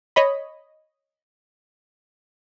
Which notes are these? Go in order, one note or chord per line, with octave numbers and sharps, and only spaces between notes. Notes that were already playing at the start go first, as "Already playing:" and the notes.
C#5 D#5 B5